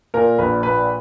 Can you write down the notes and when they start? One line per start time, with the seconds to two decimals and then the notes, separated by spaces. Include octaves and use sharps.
0.14 A#2 A#4
0.38 A#1 B4
0.63 A#2 B4